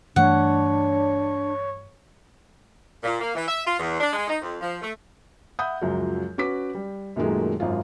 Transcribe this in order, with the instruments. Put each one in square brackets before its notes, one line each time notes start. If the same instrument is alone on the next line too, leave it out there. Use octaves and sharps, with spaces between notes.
[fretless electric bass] G2 E3 A3 [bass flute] D4 [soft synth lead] C#5 [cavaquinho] F#5
[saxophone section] A#2
A#3
E3
E5
F4
E2
D4
G#3
D#4
F2
F3
A3
[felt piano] E5 F#5 B5 D#6 G6
C#2 F#2 F3 F#3
C#4 F#4 B4 D6 B6
G3
F#2 A#2 D#3 F#3 G#3 A3
G#1 F#2 F#3 F4